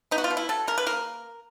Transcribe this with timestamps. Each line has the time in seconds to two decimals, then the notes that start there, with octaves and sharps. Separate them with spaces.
0.11 B3 D#4
0.18 F#4
0.24 F4
0.30 B2
0.37 E4
0.49 F#3 A4
0.67 C#3 A#4
0.78 B4
0.86 A#3 A#4